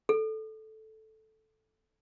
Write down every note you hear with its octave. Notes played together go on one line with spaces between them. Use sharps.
A4